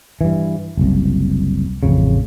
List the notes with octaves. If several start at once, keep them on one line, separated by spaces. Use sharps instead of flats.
G2 E3
F#1 C2
A1 F2 C#3